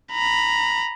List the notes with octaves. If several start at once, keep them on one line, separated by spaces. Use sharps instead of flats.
A#5 B5